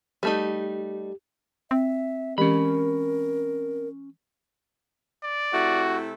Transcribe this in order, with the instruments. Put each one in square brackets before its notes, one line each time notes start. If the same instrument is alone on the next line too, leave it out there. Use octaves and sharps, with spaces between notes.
[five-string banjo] G3 A3 D#4 [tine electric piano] G4
[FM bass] C4 [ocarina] E5
[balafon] E3 G#3 G4 [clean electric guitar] C#4 B5 [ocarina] A#4
[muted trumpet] D5
[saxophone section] C3 A3 E4 [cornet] F#4